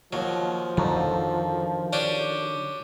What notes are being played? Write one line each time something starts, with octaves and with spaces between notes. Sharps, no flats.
D#2 F3 F#3
F2 D3 D#3 F#3
C#4 D4 G4